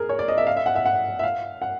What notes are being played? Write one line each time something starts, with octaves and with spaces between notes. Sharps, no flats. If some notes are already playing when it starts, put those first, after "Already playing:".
Already playing: G#4 A#4
C#5
D5
D#5
E5
F5
E5
F#5
E5
F#5
E5
F5
F#5